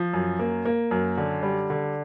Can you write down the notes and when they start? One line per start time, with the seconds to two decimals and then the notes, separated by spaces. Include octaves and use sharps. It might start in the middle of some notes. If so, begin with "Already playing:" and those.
Already playing: F3
0.13 F#2
0.39 A#3
0.65 A#3
0.91 F#2
1.18 D3
1.43 G3
1.70 D3